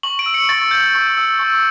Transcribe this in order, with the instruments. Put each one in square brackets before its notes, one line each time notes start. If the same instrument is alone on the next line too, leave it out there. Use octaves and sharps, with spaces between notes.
[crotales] C#6 F#7
D7
E6
C#7
C#6 A6
G6
C#6
E6
C#6